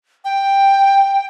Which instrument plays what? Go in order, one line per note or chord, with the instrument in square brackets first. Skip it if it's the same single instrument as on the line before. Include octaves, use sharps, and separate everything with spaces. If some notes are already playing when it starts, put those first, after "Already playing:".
[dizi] G5